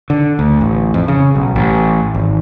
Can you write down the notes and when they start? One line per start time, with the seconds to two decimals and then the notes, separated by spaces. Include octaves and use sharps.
0.10 D3
0.39 D2
0.61 A1
0.94 F2
1.08 C#3
1.35 B1
1.56 A1
2.14 G#1